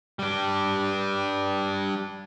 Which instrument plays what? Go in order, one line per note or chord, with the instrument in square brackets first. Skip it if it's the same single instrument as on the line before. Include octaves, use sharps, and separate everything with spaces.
[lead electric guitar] G3 D4